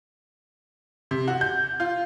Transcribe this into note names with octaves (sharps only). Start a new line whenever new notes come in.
C3
F#4
G6
F4